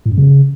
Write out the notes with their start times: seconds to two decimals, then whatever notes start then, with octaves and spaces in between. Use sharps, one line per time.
0.06 A2
0.12 F#2
0.18 C#3